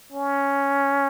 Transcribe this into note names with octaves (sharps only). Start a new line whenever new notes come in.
C#4